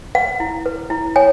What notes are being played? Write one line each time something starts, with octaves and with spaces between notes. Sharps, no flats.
B4 F#5
E4
B4
E4
C#5 G#5